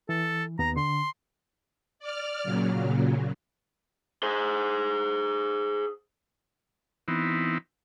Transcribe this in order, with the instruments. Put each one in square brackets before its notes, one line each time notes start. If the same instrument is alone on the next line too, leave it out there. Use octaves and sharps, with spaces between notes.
[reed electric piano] E3 [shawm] A4
[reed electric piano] D#2 B3 [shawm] A#5
[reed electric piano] D3 [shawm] C6
[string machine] D5 F6
A#2 C#3 F#3
[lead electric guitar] G#4 C5
[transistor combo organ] E3 B3 C4 D#4 E4